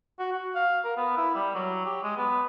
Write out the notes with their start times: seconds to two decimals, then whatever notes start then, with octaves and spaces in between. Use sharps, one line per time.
0.19 F#4
0.33 F#4
0.55 F5
0.84 A#4
0.97 B3
1.17 E4
1.35 G3
1.55 F#3
1.85 G4
2.03 G#3
2.17 B3